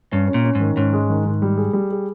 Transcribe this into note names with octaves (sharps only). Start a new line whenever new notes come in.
G2 C#4
C#4
A#2
C#4
G#2
D#3
G#2 C#4
G#3
D#3
D#3
G3
G#4
G3
G#4